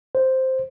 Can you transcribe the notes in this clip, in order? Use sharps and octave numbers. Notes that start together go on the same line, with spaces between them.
C5